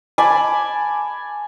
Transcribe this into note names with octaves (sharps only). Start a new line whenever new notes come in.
G#5 A5 B5 D6